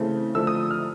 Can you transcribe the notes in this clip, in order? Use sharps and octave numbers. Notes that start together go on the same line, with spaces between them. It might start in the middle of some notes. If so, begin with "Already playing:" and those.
Already playing: C#3 E3 A3 C4
D3 F3 A3 E6
D#6
F6